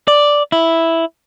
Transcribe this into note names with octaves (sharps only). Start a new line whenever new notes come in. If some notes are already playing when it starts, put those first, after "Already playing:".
D5
E4